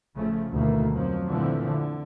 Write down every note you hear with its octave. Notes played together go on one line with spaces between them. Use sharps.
A1 C#3 F3 A3
D2 B2 D#3 E3 A3 A#3
F2 F3 F#3
A#2 D3 E3 F3 A3 C4
D3